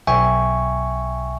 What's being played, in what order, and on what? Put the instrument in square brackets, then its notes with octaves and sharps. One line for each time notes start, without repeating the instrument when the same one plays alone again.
[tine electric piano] B1 E5 G5 G#5 C#6